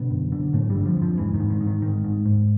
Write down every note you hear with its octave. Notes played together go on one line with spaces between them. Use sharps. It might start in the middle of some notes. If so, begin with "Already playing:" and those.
Already playing: B2 D3 B3
F#2
D3
F#2 A2 A3
G2 G3
D3
F2 F3
F#2
F2 F3
E2 G#2 E3
D#3
G#2
D#3
G#2
D#3
G#2 D#3
G#2
G#2